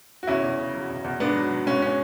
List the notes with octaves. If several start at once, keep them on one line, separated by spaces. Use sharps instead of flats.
F#4
E2 C#4 E4
E2
C#3
F#3
E2
E2
G#2 B3 D4
F#3
F#3
G#2 C#4
C#4